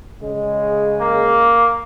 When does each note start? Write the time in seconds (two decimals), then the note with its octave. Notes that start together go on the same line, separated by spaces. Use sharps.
0.21 C#3 G#3
1.01 A#3